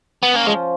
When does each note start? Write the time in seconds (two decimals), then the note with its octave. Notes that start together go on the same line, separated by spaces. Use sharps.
0.23 B3
0.33 A#3 C#4
0.47 F3 G#3